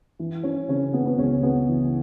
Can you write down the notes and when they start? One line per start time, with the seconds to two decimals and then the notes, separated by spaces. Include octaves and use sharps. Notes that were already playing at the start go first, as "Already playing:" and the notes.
0.19 E3
0.43 E3 C#4
0.69 C#3 C#4
0.93 C#3 B3
1.06 B3
1.18 C#2 C#4
1.43 C#3 B3
1.68 E3